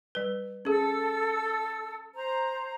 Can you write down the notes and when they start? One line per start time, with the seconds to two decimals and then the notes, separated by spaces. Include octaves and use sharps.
0.15 G3 B4
0.65 C#4 G#4 A4 E6
2.15 C5 A#5